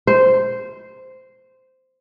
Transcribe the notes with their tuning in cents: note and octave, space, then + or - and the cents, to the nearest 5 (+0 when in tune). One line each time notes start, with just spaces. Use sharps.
C5 -10